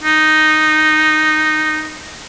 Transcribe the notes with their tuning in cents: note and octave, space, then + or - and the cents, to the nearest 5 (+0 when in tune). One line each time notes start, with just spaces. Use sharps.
D#4 -5